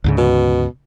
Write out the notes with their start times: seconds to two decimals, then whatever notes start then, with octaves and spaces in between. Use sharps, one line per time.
0.04 D2 G#2 C#3
0.18 B2